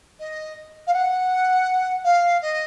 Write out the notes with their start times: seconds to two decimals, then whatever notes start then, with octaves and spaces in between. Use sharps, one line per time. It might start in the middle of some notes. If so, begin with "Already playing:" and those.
0.19 D#5
0.87 F5
0.93 F#5
2.04 F5
2.41 D#5